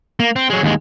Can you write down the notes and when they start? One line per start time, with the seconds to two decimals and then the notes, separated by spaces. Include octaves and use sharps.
0.20 A#3
0.36 C4
0.50 F#3 G#3
0.63 D#2 G#3